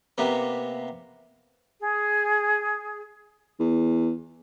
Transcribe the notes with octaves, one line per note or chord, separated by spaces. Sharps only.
C3 A#3 B3
G#4
E2